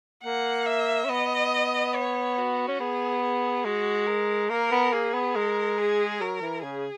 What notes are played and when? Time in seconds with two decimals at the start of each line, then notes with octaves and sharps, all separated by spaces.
0.24 A#3 F#5
0.66 E5
1.05 C#4
1.09 B3 D#5
1.95 C#5
2.37 F#4
2.68 C#4
2.79 B3 G#4
3.23 G#4
3.65 G#3 F#4
4.07 A#4
4.50 A#3 A#4
4.71 B3
4.93 A#3 G#4
5.14 B3
5.35 G#3 A#4
5.78 G#4
6.21 F#3 A#4
6.42 E3
6.64 C#3 G#4